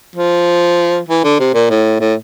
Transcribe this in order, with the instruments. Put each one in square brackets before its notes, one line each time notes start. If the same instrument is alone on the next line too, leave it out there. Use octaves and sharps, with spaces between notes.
[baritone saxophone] F3
E3
D3
C3
A#2
A2
A2